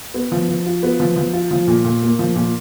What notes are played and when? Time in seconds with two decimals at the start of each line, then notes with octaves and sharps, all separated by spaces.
0.14 B3
0.32 F3
0.49 F3
0.66 F4
0.83 B3
1.00 F3
1.16 F3
1.33 F4
1.51 F3
1.67 A#2
1.85 A#2
2.02 A#3
2.19 F3
2.36 A#2